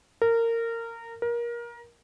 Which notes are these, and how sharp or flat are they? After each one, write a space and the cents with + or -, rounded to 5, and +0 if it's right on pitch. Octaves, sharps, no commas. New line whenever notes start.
A#4 -20
A#4 +25